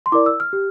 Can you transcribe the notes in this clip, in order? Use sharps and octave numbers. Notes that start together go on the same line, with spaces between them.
C6
E4 A#4 D5 D6
E6
F6
G4